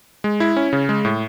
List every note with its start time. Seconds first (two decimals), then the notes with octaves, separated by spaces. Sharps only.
0.24 G#3
0.40 E4
0.56 C#4
0.73 C#3
0.89 G#3
1.05 A2